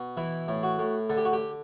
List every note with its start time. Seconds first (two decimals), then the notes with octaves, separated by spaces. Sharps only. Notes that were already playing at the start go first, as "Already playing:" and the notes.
Already playing: B2
0.17 E3 E4
0.48 A2
0.63 F#4
0.79 A2
1.09 D3 A4
1.17 G4
1.25 F#4
1.33 G4